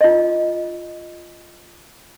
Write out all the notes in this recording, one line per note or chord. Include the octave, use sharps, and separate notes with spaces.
F4 D#5